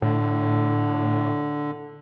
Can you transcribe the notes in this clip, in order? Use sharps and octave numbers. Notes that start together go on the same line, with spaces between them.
A2 D3